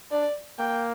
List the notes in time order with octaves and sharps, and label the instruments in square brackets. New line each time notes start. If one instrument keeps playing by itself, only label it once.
[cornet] D4 [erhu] D5
[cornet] A#3 [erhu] G5